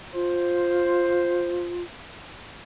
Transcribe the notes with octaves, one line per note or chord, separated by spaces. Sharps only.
F4 C5